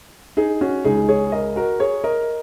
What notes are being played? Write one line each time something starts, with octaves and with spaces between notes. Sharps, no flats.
D#4 G#4
C#4 F#4
C#2 C#3 D#4 G#4
G#4 C#5
A#4 D#5
F#4 A#4
G#4 C#5
A#4 D#5